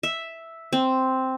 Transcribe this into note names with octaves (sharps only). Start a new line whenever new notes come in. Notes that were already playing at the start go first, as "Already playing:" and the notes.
E5
C4